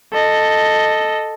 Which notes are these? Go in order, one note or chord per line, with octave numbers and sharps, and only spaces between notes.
A4 D#5